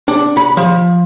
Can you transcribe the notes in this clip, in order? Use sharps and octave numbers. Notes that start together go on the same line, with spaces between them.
D4
B5
F3